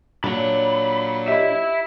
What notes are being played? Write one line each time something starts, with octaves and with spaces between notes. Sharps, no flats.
A#2 F#3 D4 C#5 B5
G4 D#5 E5 B5